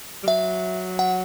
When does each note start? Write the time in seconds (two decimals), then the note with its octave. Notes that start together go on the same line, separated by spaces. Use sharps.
0.23 G3
0.27 F#3 E5
0.99 F#5